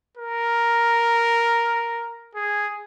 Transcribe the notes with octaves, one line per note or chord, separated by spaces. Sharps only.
A#4
G#4